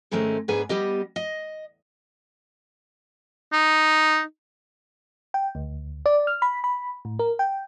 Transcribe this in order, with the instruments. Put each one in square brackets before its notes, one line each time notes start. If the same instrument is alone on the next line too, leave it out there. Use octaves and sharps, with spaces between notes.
[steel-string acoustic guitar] G#2 D#3 G#3 A3 C4 C#4
G#2 B3 D4 G#4 B4 G#5
G3 B3 G4 D#5
D#5
[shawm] D#4
[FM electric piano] G5
D2
D5
F6
B5
B5
A2
A#4
G5